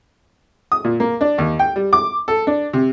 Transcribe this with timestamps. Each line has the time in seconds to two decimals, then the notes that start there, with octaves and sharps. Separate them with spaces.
0.72 D#6
0.84 A#2
1.00 A#3
1.21 D4
1.38 D#2
1.59 G5
1.76 G3
1.93 D6
2.28 A4
2.47 D4
2.73 C3